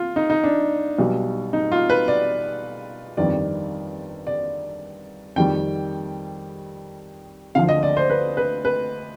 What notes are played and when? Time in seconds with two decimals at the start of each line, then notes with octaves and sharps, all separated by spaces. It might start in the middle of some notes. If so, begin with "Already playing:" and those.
Already playing: F4
0.16 D#4
0.30 D#4
0.44 D4
0.98 B1 B2 G3
1.53 D#4
1.72 F4
1.90 B4
2.08 D5
3.17 G1 F2 D#3 G3 D5
4.27 D5
5.36 F2 D#3 G3 G5
7.55 D2 D3 F3 F5
7.69 D#5
7.83 D5
7.97 C5
8.10 B4
8.37 B4
8.65 B4